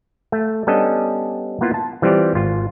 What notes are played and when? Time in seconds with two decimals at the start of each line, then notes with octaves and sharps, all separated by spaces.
0.32 A3
0.67 G3 B3 C#4 D4 A4 D#5
1.61 A#3 B3 E4 F4
1.74 A5
2.02 E3 G3 C4 F4 G4 D5
2.35 G#1 F4